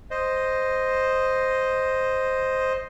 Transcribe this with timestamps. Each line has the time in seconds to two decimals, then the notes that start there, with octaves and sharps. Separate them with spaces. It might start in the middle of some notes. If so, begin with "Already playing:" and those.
0.11 C5 D#5